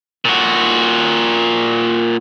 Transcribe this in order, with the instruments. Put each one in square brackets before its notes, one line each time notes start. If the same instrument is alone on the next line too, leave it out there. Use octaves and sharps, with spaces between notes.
[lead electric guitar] A#2 F#4